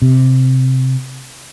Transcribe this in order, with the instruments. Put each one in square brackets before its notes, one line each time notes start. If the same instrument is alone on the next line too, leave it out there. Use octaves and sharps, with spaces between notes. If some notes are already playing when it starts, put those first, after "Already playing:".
[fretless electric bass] C3